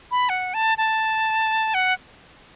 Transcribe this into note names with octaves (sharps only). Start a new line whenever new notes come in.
B5
F#5
A5
A5
F#5